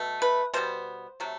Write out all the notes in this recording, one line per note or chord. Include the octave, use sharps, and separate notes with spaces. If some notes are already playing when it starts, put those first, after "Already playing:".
Already playing: B2 A3
B4
B2 G3 B3 C5
C3 F#3 A3